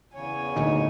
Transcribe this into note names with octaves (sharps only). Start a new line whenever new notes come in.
E2 C#3 C#5 G#5
D2 A#2 D3 D#4